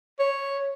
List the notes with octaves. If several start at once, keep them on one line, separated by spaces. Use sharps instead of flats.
C#5